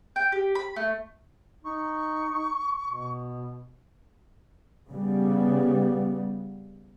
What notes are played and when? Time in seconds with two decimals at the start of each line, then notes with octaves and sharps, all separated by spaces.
0.16 G5
0.32 G4
0.55 B5
0.76 A3
1.65 D#4 C#6
2.88 B2
4.90 C#3 G3 B3